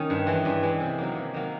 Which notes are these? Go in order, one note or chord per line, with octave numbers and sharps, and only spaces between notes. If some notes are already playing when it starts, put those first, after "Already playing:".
Already playing: D#3 C#4
G2
E3 G#3
G2
E3 G#3
C3
D#3 F#3 A#3
C3
D#3 F#3 A#3